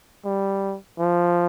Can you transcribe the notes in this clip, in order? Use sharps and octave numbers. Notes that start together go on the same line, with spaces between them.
G3
F3